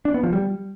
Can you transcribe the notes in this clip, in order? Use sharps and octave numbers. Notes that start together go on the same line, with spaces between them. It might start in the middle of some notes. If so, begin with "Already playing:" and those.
D4
B3
F3
G3